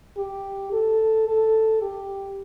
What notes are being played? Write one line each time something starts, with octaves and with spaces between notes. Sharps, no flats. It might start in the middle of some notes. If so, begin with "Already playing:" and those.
G4
A4
A4
G4